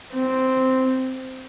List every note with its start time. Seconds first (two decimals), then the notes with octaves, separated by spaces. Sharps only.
0.12 C4